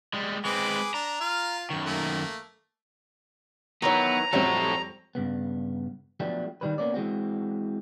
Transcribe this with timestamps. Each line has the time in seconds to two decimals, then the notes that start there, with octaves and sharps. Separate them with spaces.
0.14 G3 G#3
0.45 G#3 C4 G#4 B4 D6
0.94 D4 A#5
1.21 F4 F5
1.70 F#2 D#3 C#6
1.86 A3 A#3
3.82 D#3 E3 F#3 B3 A#5
4.33 F2 F#3 G3 A3 C4 D#4 A4 C#5
5.15 G2 C#3 B3
6.20 F3 F#3 A3 B3 D4 G4
6.61 D#3 G3 B4
6.78 A#3 B3 C#4 D5
6.94 E3 G#3 C4 F#4